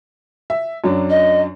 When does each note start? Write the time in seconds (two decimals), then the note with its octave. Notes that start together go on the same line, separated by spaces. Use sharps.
0.50 E5
0.84 F#2 F#3 D4
1.10 D#5